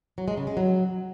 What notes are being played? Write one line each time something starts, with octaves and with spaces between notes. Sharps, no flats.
F#3
G#3
C#3
G#3
F#3